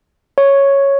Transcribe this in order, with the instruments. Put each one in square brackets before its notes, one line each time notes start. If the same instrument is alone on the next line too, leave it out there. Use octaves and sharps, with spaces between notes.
[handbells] C#5